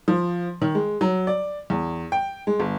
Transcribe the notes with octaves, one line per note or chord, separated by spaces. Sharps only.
F3
D#3
G#3
F#3
D5
E2
G5
G#3
G1